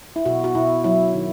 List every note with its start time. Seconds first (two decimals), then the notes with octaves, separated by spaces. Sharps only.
0.16 E4
0.26 B2 F#4
0.44 F#4
0.55 B2 E4
0.84 F#3 E4
1.14 D#3